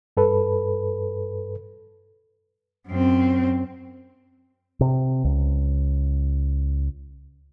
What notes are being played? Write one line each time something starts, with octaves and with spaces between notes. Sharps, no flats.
G2 A4 B4
F#2 C4
C3
C#2